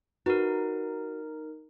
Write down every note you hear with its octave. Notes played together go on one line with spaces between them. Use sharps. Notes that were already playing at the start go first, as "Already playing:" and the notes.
D#4 F#4 A#4 B4